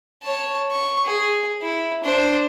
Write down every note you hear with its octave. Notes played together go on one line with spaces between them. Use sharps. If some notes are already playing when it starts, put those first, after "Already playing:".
C#5 A5
C#6
G#4
E4
D4 C5